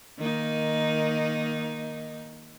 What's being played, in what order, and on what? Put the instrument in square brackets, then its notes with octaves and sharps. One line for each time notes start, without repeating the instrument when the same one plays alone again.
[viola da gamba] D#3 A#3 D#4